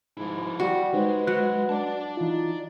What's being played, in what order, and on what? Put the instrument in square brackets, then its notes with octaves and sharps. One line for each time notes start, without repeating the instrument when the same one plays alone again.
[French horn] G#2 [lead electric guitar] F3 E4
[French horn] G3 [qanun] F#4
[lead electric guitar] G#3 [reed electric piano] D#4 C5 [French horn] B4
[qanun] F#3 [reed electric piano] F#6
[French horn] D4 [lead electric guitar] D5 A5
[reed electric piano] E3 F4 [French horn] D#4